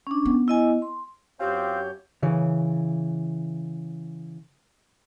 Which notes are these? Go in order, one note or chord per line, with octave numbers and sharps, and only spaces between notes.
C#4 D4
B3
E4 D#5 G#5
C6
F#2 C4 F4 G4 C#5 G6
C#3 E3 C#5